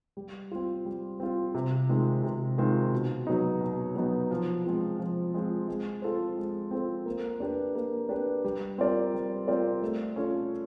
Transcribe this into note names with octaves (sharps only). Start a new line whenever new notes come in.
G3
C4 F4
G3
C4 F4
C3
D#3 G#3 C4 F4
C3
D#3 G#3 C4 F4
B2
F#3 B3 D#4
B2
F#3 B3 D#4
F3
G#3 C4 F4
F3
G#3 C4 F4
G#3
C4 F4 A4 C5
G#3
C4 F4 A4 C5
A#3
D4 G4 B4
A#3
D4 G4 B4
G3
C4 F4 A#4 D5
G3
C4 F4 A#4 D5
A3
C#4 F4 A4 C#5